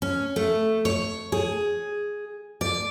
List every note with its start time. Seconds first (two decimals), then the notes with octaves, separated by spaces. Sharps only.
0.02 C#4
0.36 A3
0.85 C#5
1.32 G#4
2.61 D5